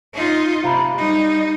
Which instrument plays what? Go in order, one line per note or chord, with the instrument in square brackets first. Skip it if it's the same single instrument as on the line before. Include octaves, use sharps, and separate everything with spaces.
[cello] D#4 F4
[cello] C3 [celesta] F5 A#5 B5
[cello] G3 D#4